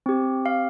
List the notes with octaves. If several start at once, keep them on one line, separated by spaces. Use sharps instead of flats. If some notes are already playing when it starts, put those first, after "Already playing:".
C4 G4
F5